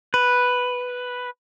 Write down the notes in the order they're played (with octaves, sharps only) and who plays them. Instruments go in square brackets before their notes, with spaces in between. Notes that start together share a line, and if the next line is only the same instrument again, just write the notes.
[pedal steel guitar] B4